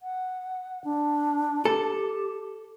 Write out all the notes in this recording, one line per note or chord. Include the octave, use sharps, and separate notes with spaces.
F#5
D4
G4 A4